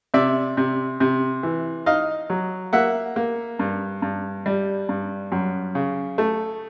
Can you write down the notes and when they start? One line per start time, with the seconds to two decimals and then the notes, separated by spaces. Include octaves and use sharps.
0.14 C3 D5 E5
0.57 C3
1.00 C3
1.43 E3
1.86 D#4 D#5 F5
2.30 F#3
2.73 A#3 E5 F#5
3.16 A#3
3.59 G2
4.02 G2
4.46 G3
4.89 G2
5.32 F#2
5.75 C#3
6.18 A3